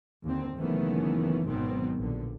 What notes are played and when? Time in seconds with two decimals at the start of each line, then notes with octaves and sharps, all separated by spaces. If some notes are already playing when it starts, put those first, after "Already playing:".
0.24 D#2 D3 C4
0.57 F#1 D#3 E3 A3 B3 C#4
1.46 G#1 B2 D#3 F#3 B3 C4
1.97 A#1 D3